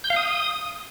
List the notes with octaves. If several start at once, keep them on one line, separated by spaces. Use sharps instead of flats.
G6
F5
D#6